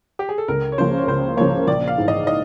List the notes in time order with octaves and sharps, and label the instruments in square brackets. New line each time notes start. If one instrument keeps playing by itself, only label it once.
[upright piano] G4
G#4
A4
[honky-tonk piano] C#2 [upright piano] A#4
[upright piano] C#5
[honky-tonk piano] C#3 F3 A#3 [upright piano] C5
[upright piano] C#5
[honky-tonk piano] C#2 [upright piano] C5
[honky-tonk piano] C#3 F3 A#3 [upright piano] C#5
[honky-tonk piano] A#1 [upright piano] D5
[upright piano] F5
[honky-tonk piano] G#2 E3
[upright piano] D#5
D#5